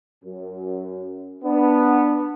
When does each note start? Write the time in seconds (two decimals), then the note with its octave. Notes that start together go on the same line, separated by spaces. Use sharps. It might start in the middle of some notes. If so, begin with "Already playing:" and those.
0.24 F#2
1.43 B3 D4